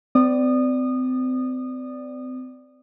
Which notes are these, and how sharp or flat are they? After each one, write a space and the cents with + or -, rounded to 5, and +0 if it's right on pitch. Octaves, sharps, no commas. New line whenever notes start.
C4 -35 D5 +0 D#6 -25